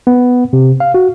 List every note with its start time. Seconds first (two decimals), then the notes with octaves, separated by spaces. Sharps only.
0.07 B3
0.53 C3
0.80 F5
0.94 F#4